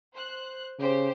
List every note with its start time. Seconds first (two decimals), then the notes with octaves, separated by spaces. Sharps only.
0.13 C5 F#6
0.79 C#3 G4 C5